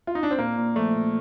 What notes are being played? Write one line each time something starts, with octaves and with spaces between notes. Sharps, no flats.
F4
D#4
D4
C4
A#2 A#3
A#2
F3 A3
A#2